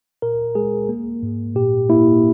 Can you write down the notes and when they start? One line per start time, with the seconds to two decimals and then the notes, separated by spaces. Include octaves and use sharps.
0.22 A#2 A#4
0.55 G#3 G#4
0.89 A#3
1.23 G#2
1.56 A#2 G4
1.89 A#3 E4